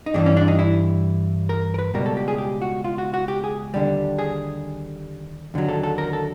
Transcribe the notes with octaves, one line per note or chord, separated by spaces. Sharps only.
D#4
G2 E3 G3 D4
C#4
D4
D#4
E4
A#4
A#4
B4
C#2 B2 G3 A#4
A4
G4
G#4
G4
F#4
F4
F#4
F#4
G4
G#4
D#2 D3 G3
G#4
D#2 D3 F#3
A4
A4
A#4
A4